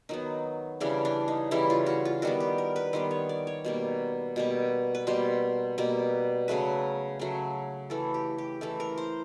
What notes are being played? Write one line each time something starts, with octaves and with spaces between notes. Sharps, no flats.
D#3 F#3 B3 D#4
C#3 E3 G3 D4
D4
D#4
C#3 E3 G3 E4
F4
F#4
F4
D#3 G3 B3 F#4
G4
A#4
B4
D#3 G3 B3 C5
C#5
D5
C#5
B2 G3 A#3
B2 G3 A#3
B4
B2 G3 A#3 C5
B2 G3 A#3
C#3 F#3 A3 B4
C#3 F#3 A3
E3 A3 A4
G4
G4
E3 A3 A4
A#4
C5